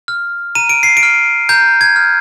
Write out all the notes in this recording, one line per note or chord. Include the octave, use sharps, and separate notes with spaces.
F6
A#5 D#7
D7
C7
D7
F6
A#5 G6
G#6
F6